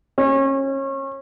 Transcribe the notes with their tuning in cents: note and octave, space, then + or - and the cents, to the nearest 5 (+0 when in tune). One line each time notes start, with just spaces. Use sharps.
C#4 -30